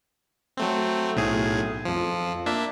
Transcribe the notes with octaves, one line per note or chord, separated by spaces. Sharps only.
F#3 A3 C4
B1 A2 G#4
F2 F3
A#3 D4 E5